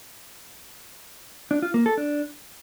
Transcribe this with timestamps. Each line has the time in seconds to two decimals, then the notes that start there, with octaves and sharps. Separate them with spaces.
1.51 D4
1.62 F4
1.74 A#3
1.86 A4
1.97 D4